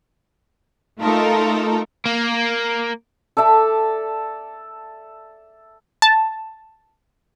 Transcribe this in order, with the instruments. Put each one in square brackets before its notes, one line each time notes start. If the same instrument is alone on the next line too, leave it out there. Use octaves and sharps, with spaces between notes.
[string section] A3 D#4 F4 A4 A#4
[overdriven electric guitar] A#3
[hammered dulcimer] A4 D5 E5 A5
[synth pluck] A5